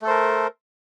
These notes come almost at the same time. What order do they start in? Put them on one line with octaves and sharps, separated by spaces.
A3 A4 C5 A#4